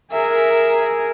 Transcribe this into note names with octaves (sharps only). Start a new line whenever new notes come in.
G#4 A#4 E5